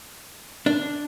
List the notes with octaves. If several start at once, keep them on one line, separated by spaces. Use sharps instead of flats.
D4